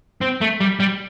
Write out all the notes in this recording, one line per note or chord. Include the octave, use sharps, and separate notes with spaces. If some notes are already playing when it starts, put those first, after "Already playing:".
C4
A3
G3
G3